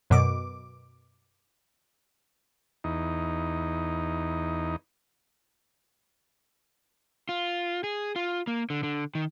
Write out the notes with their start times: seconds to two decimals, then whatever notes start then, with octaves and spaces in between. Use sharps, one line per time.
0.10 F#2 B2 D6
2.84 E2 D#4
7.29 F4
7.84 G#4
8.16 F4
8.47 A#3
8.70 D3
8.83 D3
9.15 D#3